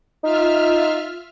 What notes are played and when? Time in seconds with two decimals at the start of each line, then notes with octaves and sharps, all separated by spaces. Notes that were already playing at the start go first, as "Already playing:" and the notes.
0.23 D#4 F4 E5 F6